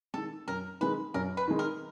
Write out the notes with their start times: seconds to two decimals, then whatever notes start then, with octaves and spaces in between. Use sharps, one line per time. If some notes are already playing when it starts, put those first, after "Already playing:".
0.14 D#3 G#3 A4
0.48 F#2 A#4
0.81 D#3 G#3 B4
1.14 F#2 A#4
1.37 B4
1.48 D#3 G#3
1.59 A#4